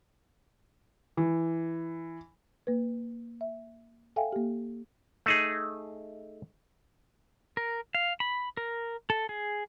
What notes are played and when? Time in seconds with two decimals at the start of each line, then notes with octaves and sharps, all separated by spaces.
1.17 E3
2.67 A#3 B4
3.41 E5
4.16 A4 E5 F5 G5 G#5
4.33 A#3 G4
5.26 A3 D#4 G#4
7.57 A#4
7.95 F5
8.20 B5
8.57 A#4
9.10 A4
9.29 G#4